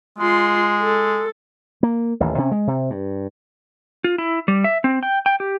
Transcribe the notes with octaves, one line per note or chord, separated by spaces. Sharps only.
G#3 F4 C6
A4
A#3
A1 D#2
C3 C#4
G#3
C3
G2
F4
E4
G3
E5
C4
G5
G5
G4